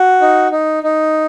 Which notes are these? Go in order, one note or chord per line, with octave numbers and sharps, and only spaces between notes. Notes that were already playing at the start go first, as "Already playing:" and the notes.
Already playing: F#4
D#4
D#4
D#4